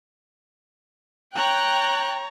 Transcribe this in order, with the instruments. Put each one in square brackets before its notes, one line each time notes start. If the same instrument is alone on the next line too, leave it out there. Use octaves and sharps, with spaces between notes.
[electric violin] C#5 A#5 [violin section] G5 F#6